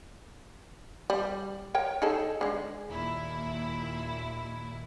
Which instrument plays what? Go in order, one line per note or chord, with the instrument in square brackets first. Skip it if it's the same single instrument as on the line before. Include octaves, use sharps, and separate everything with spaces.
[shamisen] G3
A#4 C#5 G5
D#4 G#4 A4
D3 G#3
[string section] D#2 A#2 E4